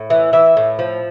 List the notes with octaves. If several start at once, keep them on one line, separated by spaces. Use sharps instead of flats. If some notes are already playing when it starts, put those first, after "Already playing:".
Already playing: A2
E3
E3 E5
A2
F3